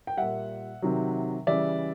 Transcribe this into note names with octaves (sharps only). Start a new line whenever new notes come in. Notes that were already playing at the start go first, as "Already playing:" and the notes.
G5
A#2 G3 E5 F#5
C3 D#3 F#3
C#3 E3 G3 D5 E5